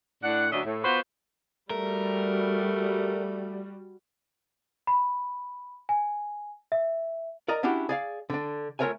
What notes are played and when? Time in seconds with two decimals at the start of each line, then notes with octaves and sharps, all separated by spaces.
0.23 A2 D4 F#5
0.52 D2 F#3 C#4 D4 D#5 E5
0.64 A2
0.84 B3 F4 F#4 B4 C5
1.70 G3 A3 F#4 A#4
4.87 B5
5.89 G#5
6.72 E5
7.48 A#4 D5 D#5 A#5
7.63 C#4 D4 E4 F#4 G4
7.89 G#4 D5 F5
8.30 D3 D4
8.79 A3 F4 A#4 C#5 E5 G#5